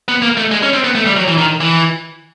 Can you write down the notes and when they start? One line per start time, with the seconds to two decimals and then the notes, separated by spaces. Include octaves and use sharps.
0.08 B3
0.22 A#3
0.37 A3
0.51 G#3
0.63 C#4
0.73 C4
0.84 B3
0.95 A3
1.06 G3
1.17 F#3
1.28 E3
1.38 D#3
1.61 E3